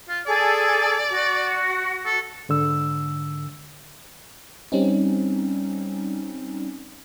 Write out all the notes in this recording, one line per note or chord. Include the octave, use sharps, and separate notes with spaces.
F4
G#4 A4 D5
F#4
A4
G#2 D3 E6
G3 C4 C#4 D#4